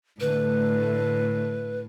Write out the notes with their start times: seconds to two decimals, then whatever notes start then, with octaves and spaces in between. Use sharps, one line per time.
0.21 A2 D3 A3 B4